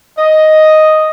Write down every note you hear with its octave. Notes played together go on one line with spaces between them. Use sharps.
D#5